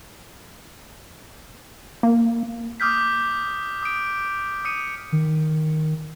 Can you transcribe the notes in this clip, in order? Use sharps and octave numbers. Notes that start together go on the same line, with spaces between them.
A#3
D6 D#6 F6 G6 B6
D#6 D7
D#6 C#7 D#7
D#3